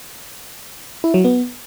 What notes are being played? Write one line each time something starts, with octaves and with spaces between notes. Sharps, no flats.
E4
F#3
B3